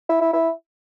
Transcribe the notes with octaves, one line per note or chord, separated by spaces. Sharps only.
E4
E4
E4